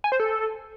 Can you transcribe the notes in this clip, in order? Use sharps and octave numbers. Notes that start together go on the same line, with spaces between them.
G#5
C5
A4